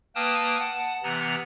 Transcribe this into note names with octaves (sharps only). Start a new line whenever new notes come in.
A#3 B4 G5 A5 D#6 F6
F#5 A5
C3 E3 B3 A#5